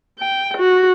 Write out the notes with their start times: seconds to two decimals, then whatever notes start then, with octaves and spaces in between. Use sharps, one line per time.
0.19 G5
0.57 F#4